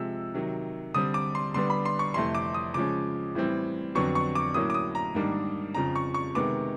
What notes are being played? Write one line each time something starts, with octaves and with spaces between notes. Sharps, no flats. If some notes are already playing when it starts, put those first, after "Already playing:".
Already playing: C3 F3 G#3 E6
C3 D#3 F#3
D3 G3 C4 D#6
D6
C6
D3 G3 B3 D4 C6
B5
C6
C#6
F2 C3 E3 A3 C6
D6
D#6
C#3 F3 G#3 C#4 D6
A2 E3 G3 C4
F2 D3 F#3 B3 D4 C#6
C#6
D6
A2 F#3 A#3 C#4 D#6
D6
D#6
A#5
G#2 D#3 G3 A#3 D4
F2 C#3 F3 A#5
C#6
C#6
C3 D#3 G#3 B3 D6